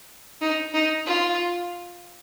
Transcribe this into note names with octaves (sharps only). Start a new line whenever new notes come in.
D#4
D#4
F4